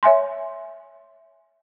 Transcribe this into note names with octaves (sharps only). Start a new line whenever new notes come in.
C#5 E5 G#5 C6